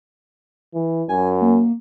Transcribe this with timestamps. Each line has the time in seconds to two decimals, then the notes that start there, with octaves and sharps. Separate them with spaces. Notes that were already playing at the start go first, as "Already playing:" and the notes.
0.74 E3
1.09 F#2 G#5
1.41 A#3